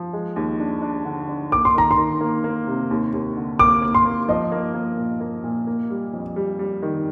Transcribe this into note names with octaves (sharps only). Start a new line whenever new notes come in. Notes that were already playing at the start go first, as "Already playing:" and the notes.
Already playing: F3
G#3
D#2
D4
D4
D3
D4
A#3 D6
C6
D#3 A#5
C6
D#3
A#3
A#3
C3
D#2
D#2
D3
A#3 D6
A#3
C6
A#3
F3 D#5
A#3
A#3
A#2
A#3
A#2
A#3
G3
F2
G3
G3
D#3